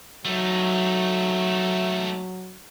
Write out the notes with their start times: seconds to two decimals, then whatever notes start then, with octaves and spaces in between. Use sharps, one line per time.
0.25 F#3 A3 D#4